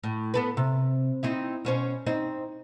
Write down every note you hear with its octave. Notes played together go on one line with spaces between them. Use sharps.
A2
B3 A4 B4
C3
C4 D#4 E4
B2 C#4 C5
C4 D#4